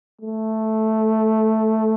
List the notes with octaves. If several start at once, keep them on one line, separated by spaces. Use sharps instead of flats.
A3